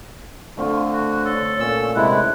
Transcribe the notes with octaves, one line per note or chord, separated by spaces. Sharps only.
D3 A3 C4 F4
F#4
A4 C#5
A#2 D3 C#4 E6
C3 G#3 E4 F#5